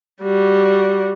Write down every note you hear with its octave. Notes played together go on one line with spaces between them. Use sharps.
G3 F#4